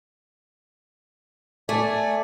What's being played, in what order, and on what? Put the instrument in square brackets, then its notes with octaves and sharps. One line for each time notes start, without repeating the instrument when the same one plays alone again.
[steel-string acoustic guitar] A3 [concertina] D5 G#5